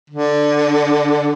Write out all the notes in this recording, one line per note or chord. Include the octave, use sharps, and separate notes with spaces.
D3